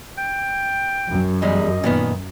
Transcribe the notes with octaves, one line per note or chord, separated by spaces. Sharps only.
G5
F#2
E2 G3 G#3 D#5
A#2 D#3 B3